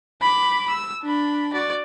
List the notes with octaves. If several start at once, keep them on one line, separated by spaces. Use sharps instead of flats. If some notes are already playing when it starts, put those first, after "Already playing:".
B5 D6
E6
D4 B5
F#4 D5